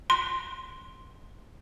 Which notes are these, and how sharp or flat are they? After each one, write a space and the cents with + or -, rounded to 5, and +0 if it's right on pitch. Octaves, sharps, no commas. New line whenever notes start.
C6 +5